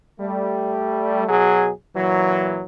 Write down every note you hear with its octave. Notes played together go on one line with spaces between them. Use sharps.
G3 A3
B2 F#3 G#4
A#2 E3 F#3